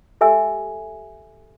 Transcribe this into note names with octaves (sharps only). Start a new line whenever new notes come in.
G4 A4 E5 G#5 E6